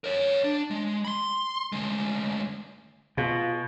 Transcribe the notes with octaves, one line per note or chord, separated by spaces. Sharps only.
A#4 C#5
D4
G#3
B5 C6
D2 G#3
B2 F4 G#4 F5